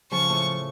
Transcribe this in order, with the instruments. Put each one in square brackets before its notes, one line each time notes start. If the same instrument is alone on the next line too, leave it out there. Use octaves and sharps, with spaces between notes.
[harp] C#3 F3 [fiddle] C#6
[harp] A2